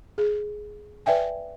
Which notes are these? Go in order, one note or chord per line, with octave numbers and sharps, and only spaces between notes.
G#4
B4 D5 E5 G5 G#5